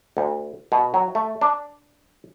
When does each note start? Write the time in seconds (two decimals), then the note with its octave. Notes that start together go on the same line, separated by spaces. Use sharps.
0.17 D2
0.72 B2
0.94 F#3
1.15 A3
1.41 D4